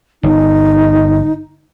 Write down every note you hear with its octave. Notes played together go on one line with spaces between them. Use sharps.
G1 D#4